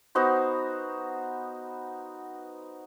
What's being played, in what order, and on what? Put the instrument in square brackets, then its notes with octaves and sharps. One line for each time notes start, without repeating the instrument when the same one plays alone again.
[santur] B3 D#4 F#4 C5